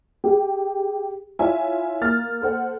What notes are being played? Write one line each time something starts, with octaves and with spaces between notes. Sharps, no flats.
G4 G#4
E4 F4 C#5 E5 G#5
A#3 A#4 F6 A6
A4 C5 F#5